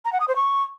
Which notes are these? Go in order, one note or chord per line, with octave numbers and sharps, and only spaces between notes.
A#5
F#5
D#6
C5
C#6